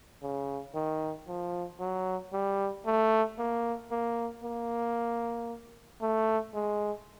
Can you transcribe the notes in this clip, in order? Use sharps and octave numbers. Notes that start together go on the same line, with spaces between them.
C#3
D#3
F3
F#3
G3
A3
A#3
A#3
A#3
A3
G#3